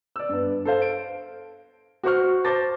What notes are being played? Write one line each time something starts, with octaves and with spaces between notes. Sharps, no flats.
D5 E6
G2 B3
A4 C5 F5
D7
F#4 C5 C#6 F6
C5 A5 D6 A6 A#6